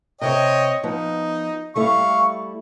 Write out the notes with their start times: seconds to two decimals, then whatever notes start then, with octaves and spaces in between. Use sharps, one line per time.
0.21 C3 C4 C5 C#5 D#5 G5
0.83 F3 B3 D#4
1.75 G3 A3 E4 F5 C#6